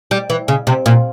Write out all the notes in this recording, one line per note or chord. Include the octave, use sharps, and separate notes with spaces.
G3
E3
C#3
C3
A#2